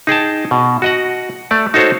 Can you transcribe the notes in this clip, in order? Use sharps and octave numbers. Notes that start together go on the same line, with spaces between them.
D#4 G#4 G5 A5
B2
F#4 D#5 F#5
A3 D5
D#4 F#4 A4 C5 C#5